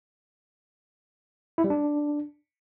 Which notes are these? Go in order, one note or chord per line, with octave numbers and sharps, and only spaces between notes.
E4
G3
D4